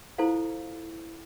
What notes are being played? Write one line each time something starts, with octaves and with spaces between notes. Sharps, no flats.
E4 F4 A4 C5 F5